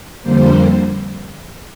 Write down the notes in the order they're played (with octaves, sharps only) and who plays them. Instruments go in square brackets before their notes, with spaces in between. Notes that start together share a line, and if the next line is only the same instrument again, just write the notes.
[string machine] F2 D3 G3 A#3 C5